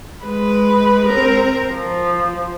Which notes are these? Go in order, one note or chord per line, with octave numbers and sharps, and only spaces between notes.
G#3 B4
C4 A#4
F3